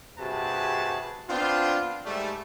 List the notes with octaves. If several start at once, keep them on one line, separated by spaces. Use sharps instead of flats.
G2 C3 F#4 G#4 B4 A5
B3 C4 D4 F4
G#2 G3 A3